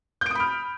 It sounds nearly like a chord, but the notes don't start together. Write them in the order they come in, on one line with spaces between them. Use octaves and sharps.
G6 D7 D#6 B5 F6